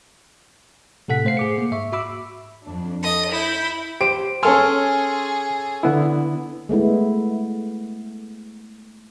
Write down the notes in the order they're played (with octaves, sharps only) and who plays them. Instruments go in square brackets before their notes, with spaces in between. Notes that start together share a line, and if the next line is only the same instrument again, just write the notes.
[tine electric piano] A2 C3 A4 F#5 B6
A3 C5 F5 C7
G#4 D6 C#7
A#3
G#2 E5 C#6
F#4 E5 B5 D6 E6
[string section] F2 D4
[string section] A4 [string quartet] D#5
[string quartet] E4 [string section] B5 G6
[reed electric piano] G4 C5 [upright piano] D7
[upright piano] C#4 A4 C6 [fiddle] G#4 [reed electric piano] G#5 E6 F6
[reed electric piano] D3 B3 E4
[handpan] G#3 A3 B3 E4